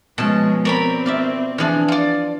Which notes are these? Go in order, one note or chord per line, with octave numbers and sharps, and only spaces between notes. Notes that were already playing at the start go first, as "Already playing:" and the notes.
B2 F3 G#3 C#4 A5
C4 A#4 C#5 D5 B5
F4 D5 E5
E3 F3 D4 G#4 F6
F4 D5